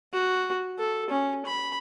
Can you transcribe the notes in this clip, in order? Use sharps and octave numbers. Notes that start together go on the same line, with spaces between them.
F#4
A4
C#4
B5